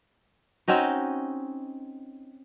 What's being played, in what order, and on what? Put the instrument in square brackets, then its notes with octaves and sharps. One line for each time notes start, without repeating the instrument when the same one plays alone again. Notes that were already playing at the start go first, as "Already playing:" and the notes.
[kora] C4 C#4 D#4 F#4